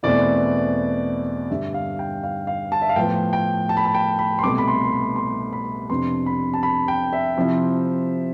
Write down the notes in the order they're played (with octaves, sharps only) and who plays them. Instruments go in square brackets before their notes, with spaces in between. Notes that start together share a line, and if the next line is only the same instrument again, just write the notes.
[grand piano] E2 B2 A3 C4 E4 D5
G2 D3 G3 E5
F5
G5
F5
F5
A5
E5
F5
A2 F3 B3 G5
G5
A5
B5
A5
G5
B5
C6
C2 B2 A3 D6
B5
C6
C6
B5
C6
B5
F2 C3 F3 B3 D4 C6
B5
A5
B5
G5
E5
C3 F3 C4 E4